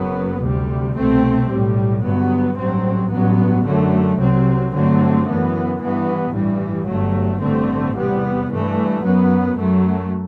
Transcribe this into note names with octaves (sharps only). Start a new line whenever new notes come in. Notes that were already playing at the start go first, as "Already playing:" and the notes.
Already playing: F#1 F#2 F#3 B3
D2 C3 G3
C2 B2 A3 C4
B1 A2 G3
G1 G2 F#3 B3
A1 G2 F#3 C4
A1 G2 F#3 B3
F#2 D3 F#3 A3
C2 C3 F#3 C4
G2 D3 F#3 A3 C4
F#2 E3 B3
G2 E3 B3
A1 G2 E3 G3
G1 G2 F#3 A3
A1 G2 D3 A3 C4
E2 C3 G3 B3
G2 E3 A3
F#2 F#3 B3
F#2 F#3 A3